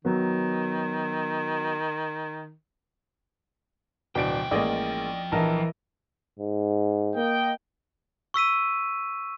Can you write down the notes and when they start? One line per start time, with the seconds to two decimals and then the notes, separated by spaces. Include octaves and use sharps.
0.05 D#3 F#3 B3
4.15 D1 B2 F3 D4 G5 D7
4.51 A1 G#3 A#3 D5 D#5
5.32 A#1 E3 A#4 D#5 A5
6.39 G#2
7.15 A#3 D#5 G5
8.34 C#6 E6 B6 D#7